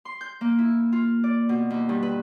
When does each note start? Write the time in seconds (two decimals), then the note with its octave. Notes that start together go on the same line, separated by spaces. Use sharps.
0.05 C6
0.21 G6
0.41 A#3
0.59 E4
0.92 F4
1.24 D5
1.49 B2
1.70 D#2
1.89 G2
2.03 B4